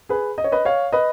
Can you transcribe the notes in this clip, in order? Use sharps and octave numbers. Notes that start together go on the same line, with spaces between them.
G#4 B4
D#5
C#5
B4 D#5
C#5 F5
B4 D#5